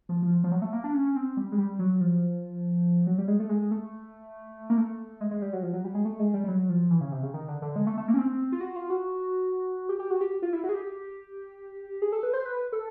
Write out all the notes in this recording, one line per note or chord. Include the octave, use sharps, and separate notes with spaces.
F3
F3
F3
F#3
A3
A#3
D4
C#4
C4
G3
G#3
G3
F#3
F3
F#3
G3
G#3
A3
G#3
A3
A#3
A3
G#3
G#3
G3
F#3
F3
F#3
G3
G#3
A3
G#3
G3
G3
F#3
F3
E3
C#3
C3
C#3
D#3
D3
D3
G#3
A3
A3
A#3
C#4
C4
F4
F#4
F4
F#4
G4
G4
F#4
G4
F4
E4
F#4
G#4
G4
G#4
A4
B4
C5
B4
A4